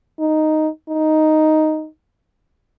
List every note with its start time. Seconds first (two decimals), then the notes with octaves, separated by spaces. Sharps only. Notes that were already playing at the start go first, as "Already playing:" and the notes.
0.20 D#4
0.89 D#4